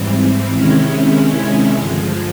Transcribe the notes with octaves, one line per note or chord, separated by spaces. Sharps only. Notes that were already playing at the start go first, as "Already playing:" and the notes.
Already playing: G#2 E3 G3 C4
C3 D#3 G#3 C#4 E4
G2 D3 F3 G#3